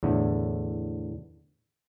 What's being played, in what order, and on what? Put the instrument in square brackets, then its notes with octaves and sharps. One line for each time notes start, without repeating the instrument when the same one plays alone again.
[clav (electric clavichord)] E2 A2 D3